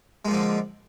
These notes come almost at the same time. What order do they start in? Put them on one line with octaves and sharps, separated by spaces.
G#3 A#2 F3 D3